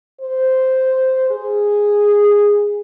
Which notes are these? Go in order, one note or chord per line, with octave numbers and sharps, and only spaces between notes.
C5
G#4